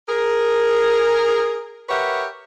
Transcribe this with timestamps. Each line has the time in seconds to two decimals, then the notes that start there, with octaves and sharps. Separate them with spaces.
0.09 G#4 A#4
1.89 G4 A#4 B4 C#5 E5 F#5